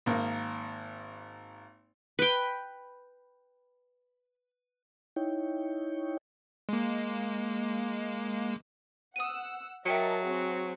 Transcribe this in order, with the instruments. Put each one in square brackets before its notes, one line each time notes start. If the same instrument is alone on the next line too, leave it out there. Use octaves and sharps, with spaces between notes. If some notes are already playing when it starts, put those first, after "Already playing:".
[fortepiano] G#1 A#3
[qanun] B4 G5
[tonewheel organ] D#4 E4 C#5 G5
[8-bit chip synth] G#3 A#3
[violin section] F#5 E6 [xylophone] D#6 D#7
[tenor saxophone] F#3 [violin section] A#4 D#5 A5 [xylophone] E5 G5 C#7
[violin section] C4 F#4 G#4